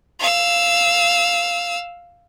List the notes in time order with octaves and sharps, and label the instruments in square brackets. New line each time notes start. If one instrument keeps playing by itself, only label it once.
[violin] F5 E6